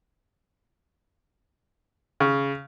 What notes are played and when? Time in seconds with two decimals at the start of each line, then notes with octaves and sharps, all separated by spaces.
2.20 C#3